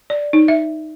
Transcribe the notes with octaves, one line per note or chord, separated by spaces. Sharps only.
D5
D#4
E5